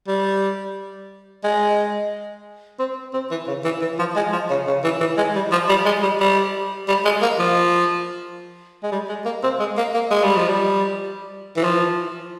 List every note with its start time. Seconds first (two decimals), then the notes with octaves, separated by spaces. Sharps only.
0.08 G3
1.44 G#3
2.79 C4
3.14 C4
3.31 E3
3.48 C#3
3.64 E3
3.81 E3
3.99 F3
4.16 G#3
4.32 F3
4.50 C#3
4.67 C#3
4.84 E3
5.00 E3
5.17 G#3
5.35 G3
5.52 F3
5.68 G3
5.85 G#3
6.03 G3
6.20 G3
6.88 G3
7.05 G#3
7.22 A#3
7.39 F3
8.83 G#3
8.92 G3
9.09 G#3
9.25 A#3
9.43 C4
9.59 G#3
9.77 A#3
9.94 A#3
10.11 G#3
10.23 G3
10.37 F3
10.48 G3
11.57 E3
11.63 F3